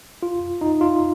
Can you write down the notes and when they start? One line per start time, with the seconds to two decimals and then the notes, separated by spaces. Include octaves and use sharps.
0.23 F4
0.61 D#4
0.81 F4